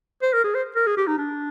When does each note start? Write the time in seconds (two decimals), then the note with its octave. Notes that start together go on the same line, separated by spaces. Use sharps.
0.22 C5
0.33 A#4
0.44 G#4
0.54 C5
0.76 A#4
0.87 G#4
0.97 G4
1.07 D#4
1.18 D4